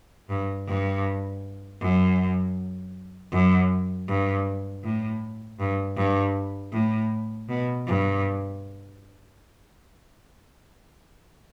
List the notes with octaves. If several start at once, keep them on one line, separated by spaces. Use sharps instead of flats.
G2
G2
F#2
F#2
G2
A2
G2
G2
A2
B2
G2